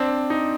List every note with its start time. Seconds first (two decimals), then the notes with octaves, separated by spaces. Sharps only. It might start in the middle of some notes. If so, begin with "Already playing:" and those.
Already playing: C4 D4
0.30 D#4